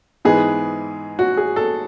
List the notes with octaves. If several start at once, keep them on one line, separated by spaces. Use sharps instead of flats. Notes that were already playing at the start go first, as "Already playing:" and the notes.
G#2 E3 G#3 B3 G#4
F#4
G#4
A4